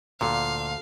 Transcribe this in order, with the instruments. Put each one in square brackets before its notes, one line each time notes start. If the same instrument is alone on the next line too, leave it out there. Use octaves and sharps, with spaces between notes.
[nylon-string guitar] D2 [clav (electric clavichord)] A#2 [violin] F5